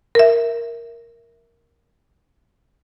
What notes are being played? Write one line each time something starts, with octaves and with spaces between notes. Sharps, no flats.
A#4 E5